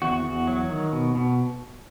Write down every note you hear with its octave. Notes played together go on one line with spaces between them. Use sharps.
E2 F#4
E2
F#3
D#3
B2
B2